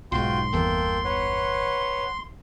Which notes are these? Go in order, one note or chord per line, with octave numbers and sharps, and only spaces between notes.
B1 G#2 F4 F#4 G5 C6
G1 E2 E3 A#3 A4 G5
B4 C#5 F#5